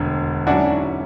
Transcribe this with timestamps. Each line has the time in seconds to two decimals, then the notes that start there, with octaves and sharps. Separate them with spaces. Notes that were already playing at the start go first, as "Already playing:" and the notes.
Already playing: E1 D2 D3
0.47 G#2 F#3 C#4 D4 E4 F#4